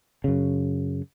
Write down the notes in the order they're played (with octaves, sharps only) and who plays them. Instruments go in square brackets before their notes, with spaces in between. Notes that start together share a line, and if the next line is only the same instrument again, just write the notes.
[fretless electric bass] F#2 C#3